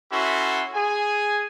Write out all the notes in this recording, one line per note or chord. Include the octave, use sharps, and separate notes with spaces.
C#4 E4 F#4 A4 E5 C6
G#4 G#5